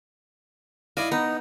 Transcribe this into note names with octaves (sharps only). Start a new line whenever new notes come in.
E4 D5 D#5 F5
B3 D#4 A#5